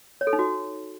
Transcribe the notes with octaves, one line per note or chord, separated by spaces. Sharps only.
C#5
A4
D#4
F#4